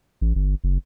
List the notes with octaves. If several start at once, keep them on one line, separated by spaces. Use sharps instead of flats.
A1
G1
F#1